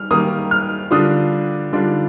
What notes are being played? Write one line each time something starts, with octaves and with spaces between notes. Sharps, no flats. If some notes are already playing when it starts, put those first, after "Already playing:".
Already playing: G3 F6
D#3 G3 A#3 D#6
F6
D3 G3 D4 F4 D#6
D3 G3 D4 F4